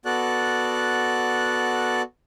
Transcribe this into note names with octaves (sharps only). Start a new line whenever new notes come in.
B3 F#4 A4 D5 F#6